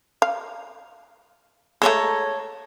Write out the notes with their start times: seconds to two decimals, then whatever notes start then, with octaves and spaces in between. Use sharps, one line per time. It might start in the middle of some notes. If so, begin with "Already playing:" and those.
0.22 F5
1.82 G#3 A3 A4 C#5 A#5